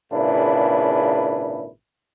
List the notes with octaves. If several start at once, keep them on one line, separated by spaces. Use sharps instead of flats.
G#1 A#2 C#3 D4 E4 B4